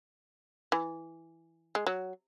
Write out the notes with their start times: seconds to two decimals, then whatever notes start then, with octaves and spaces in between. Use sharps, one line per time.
0.72 E3
1.75 G#3
1.87 F#3